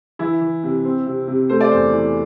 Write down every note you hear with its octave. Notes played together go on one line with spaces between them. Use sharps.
E3 E4
E3
C3
C4
C3
C3
A3 C5
D5
E2 C5
E3